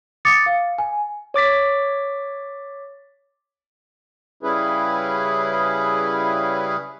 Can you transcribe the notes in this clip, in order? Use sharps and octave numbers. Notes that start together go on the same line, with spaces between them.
D6 D#6 A6 C#7
F5
G#5
C#5 D6 A6 B6
C#3 G3 C#4 E4 G#4 B4